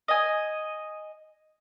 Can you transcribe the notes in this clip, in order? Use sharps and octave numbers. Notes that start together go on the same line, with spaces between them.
D#5 G#5